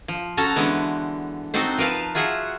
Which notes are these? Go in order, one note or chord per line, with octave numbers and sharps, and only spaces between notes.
F3
C#4 F#4 A4 A5 A#5
D3 E3 G#3 B3
C4 D#4 F#4 A4 C5
F3 A#4 B4 F5 A5
F4 F#4 G#4 E5 F#5